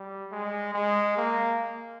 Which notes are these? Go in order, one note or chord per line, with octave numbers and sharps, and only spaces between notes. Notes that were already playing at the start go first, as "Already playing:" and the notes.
Already playing: G3
G#3
G#3
A#3